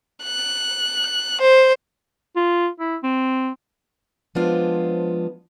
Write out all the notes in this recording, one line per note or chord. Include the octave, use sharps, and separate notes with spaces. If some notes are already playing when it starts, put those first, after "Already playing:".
F#6
C5
F4
E4
C4
F3 G#3 B3 D4 F4 C5